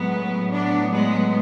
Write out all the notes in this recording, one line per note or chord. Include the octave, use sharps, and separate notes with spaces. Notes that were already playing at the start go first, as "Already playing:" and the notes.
Already playing: A2 F#3 G#3 B3
B3 D4
G#3 B3